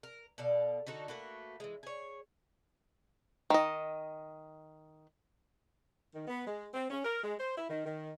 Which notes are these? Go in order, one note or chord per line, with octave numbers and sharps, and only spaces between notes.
A#4
B2 A4 D5 F5
D3 D#4 F#4 A4
A3 A#3 F#4 B4
E3 G#3
G#4 C#5
D#3 D#5
D#3
B3
G#3
C4
C#4
A#4
G#3
C5
E4
D#3
D#3